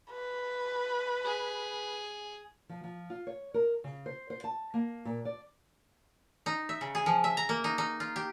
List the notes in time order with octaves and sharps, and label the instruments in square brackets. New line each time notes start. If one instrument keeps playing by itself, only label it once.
[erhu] B4
[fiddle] G#4
[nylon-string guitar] F3
F3
F4
C#5
A#4
C#3
C5
C5
A5
A#3
A#2
D5
[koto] D#4
E5
C#3
G#4
F3
E5
A#5
A#3
D#4
D#4
F4
G4